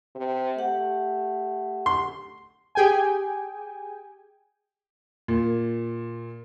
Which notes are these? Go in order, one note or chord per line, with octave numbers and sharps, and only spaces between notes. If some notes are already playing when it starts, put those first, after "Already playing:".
C3
A3 G4 F#5
C6
G4 G#4 G5 G#5
A#2